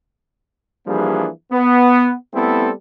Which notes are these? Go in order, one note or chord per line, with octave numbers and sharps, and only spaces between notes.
E3 F3 G3 A#3 D4 G#4
B3
G3 A3 B3 C4 E4 A4